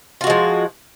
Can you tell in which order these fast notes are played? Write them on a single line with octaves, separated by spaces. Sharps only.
F4 F#4 G#3 F3